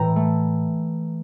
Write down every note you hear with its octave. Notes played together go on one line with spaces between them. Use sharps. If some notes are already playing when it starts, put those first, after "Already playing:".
Already playing: A2 E3 E5 G5 A#5
A3